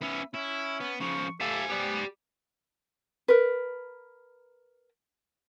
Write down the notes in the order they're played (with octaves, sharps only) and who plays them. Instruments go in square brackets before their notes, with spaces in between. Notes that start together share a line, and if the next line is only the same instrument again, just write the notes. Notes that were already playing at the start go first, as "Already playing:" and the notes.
[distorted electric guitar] B3 C#4 [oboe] E5
[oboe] C#4 [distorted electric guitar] E4
[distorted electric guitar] B3
[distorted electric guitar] C#3 F3 [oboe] C#6
[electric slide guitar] G4 E5 F5 [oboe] A4 [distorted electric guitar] C5 G#5
[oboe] B3 [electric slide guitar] G4 D5
[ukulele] A#4 B4